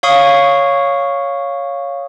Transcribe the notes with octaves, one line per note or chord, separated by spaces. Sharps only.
C#5 F5 C#6 D#6